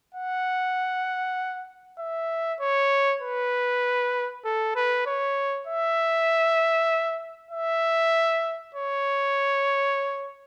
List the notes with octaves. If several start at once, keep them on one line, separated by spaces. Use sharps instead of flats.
F#5
E5
C#5
B4
A4
B4
C#5
E5
E5
C#5